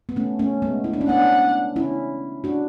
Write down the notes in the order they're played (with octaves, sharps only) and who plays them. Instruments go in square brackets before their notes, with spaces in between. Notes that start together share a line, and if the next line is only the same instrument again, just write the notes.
[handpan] B3
A3 C#4
A3 C#4
G#3 B3
E4
D4
C#4
[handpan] B3 D4 [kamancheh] F#5
[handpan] C#4 E4
D4 F#4